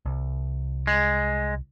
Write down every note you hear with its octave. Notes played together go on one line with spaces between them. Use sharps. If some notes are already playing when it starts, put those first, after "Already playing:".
C2
G#3